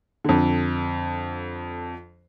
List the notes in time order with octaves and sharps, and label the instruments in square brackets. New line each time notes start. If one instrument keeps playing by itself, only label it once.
[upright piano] F2 D3